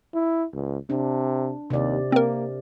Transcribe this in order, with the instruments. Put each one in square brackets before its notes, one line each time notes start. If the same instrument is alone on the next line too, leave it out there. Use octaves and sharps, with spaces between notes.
[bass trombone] E4
C#2
[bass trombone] C3 [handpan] D4
[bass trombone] D#2 [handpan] C3 D5
[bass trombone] A#3 [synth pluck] C4 A#4